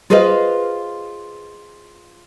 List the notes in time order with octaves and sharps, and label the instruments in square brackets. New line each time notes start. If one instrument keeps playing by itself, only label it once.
[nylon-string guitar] F4 G#4 B4 C5 D#5 F5